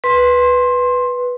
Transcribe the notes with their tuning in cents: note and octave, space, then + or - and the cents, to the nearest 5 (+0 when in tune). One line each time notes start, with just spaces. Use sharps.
B4 +0 C6 +15